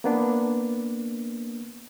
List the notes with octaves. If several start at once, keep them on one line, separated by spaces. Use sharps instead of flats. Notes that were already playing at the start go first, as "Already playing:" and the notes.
A#3 B3 D4